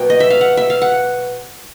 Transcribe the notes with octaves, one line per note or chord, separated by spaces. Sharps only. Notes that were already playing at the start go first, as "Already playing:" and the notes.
Already playing: B2 F#3 A#3 G5
D#5
E5
F5
F#5
E5
F5
F#5